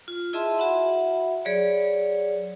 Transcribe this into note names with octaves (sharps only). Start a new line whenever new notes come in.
F4
E4 G#4 D#5 E5 A5 C6
F#4 E5 F#5 B5
F#3 G#4 C#5 D5